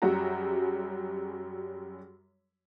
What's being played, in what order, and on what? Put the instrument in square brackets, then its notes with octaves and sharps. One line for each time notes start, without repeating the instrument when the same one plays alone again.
[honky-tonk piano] F#2 F#3 G3 F#4 G#4 A#5